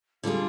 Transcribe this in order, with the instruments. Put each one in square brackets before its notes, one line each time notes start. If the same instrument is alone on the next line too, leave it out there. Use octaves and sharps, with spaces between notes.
[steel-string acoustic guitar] D3 G3 D4 G#4 [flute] F4